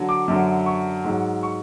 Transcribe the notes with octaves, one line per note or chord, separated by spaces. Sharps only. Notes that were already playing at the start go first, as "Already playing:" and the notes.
Already playing: D3 F#3
D6
F#2 D3 F#3
C#6
G#2 F#3
C#6